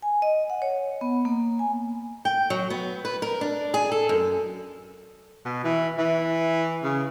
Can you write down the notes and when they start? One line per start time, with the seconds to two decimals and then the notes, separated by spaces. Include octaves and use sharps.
0.02 G#5
0.22 D#5
0.50 F#5
0.62 C#5
1.01 B3
1.25 A#3
1.59 G#5
2.25 G5
2.50 F#3
2.70 B3
3.05 B4
3.22 A#4
3.41 D4
3.74 G#4
3.92 A4
4.09 F#2
5.45 B2
5.64 E3
5.98 E3
6.84 C#3